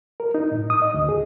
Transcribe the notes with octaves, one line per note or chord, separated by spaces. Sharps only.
A#4
D#4
A2
D#6
D#5
D2
G#4